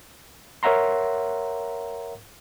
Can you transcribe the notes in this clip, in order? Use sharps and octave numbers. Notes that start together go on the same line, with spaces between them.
A#4 C#5 E5 F#5 A#5 C6